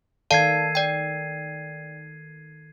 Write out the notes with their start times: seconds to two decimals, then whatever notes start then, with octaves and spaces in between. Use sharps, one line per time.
0.31 D#3 A4 D5 F5 A5 G#6 C7 D#7
0.75 D5 G5